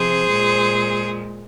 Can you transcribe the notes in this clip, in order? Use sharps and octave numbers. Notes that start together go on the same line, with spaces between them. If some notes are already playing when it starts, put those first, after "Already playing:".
Already playing: C3 F3 G#4 C5
A#2 G#3